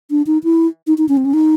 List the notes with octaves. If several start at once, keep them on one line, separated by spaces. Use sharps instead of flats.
D4
D#4
E4
D#4
D#4
C#4
C4
C#4
D#4